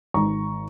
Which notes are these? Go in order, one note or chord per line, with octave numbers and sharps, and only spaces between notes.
G#1 A#5 C#6